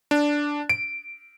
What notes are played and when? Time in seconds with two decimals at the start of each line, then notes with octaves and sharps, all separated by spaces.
0.11 D4
0.69 D7